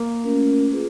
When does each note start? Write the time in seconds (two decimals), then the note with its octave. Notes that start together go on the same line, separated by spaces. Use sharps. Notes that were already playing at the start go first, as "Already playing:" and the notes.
Already playing: A#3
0.24 A3 C#4 F4 A#4
0.72 F4 G#4 B4